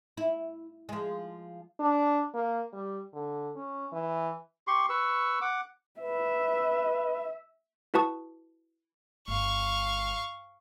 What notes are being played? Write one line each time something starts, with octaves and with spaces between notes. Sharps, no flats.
E4
F3 G#3
D4
A#3
G3
D3
C#4
E3
G4 C6 C#6
B4 C#6 E6
F#5 D6
B4 E5
E4 F#4 B4 A5 C#6 D#6
G1 F5 C#6